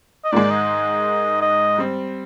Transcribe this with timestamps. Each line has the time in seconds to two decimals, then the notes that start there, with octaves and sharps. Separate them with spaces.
0.25 D#5
0.32 G#2 D#3 G#3 D5
0.51 D#5
1.42 D#5
1.78 G3 C4